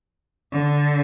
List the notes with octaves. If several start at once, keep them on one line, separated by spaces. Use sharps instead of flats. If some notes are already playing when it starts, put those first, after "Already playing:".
D3